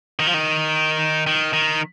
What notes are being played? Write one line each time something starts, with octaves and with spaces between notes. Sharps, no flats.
D#3
F3
D#3
D#3
D#3